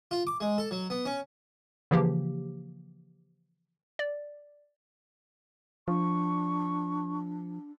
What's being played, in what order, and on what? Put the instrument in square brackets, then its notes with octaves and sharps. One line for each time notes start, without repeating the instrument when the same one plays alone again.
[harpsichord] F4
D6
G#3
A4
F#3
B3
C#4
[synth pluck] C#3 E3 F3 A#3 G4
D5
[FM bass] F3 [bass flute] D4 [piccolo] C#6